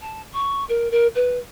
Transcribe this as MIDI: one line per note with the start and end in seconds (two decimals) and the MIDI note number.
0.02 0.22 81
0.34 0.64 85
0.69 0.90 70
0.91 1.07 70
1.15 1.38 71